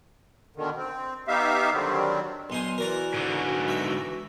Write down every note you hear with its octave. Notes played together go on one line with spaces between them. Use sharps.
B2 D3 D#3
C4
B3 D#4 G4 E5 F5
D3 D#3 F#3 G3 C4
B1 D#4 G#5 C6
E3 F#4 A#4 D5 A#5
G#2 D3
E5